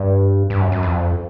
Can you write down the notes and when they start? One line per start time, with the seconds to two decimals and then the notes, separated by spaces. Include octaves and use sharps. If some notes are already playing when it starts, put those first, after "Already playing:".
Already playing: G2
0.50 G2
0.61 F#2
0.72 F#2
0.83 F2